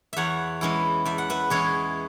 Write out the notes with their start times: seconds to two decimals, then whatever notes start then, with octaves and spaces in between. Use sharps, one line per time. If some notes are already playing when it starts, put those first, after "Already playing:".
0.13 E2 C#5 E5 F#5
0.61 E3 G#3 C#4 E4
1.05 E2 E5
1.18 F#5
1.30 B4 E5
1.50 E3 G#3 C#4 E4 G#4 C#5